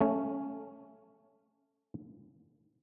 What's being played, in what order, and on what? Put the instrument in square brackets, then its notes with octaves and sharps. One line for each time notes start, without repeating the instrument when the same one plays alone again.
[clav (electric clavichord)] A3 C#4